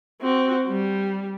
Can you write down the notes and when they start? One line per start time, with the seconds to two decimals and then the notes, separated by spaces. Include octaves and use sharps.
0.21 C4 F#4
0.68 G3